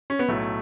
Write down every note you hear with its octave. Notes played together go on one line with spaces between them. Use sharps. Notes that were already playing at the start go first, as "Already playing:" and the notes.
C#4
B3
B1 A2 F#3 A3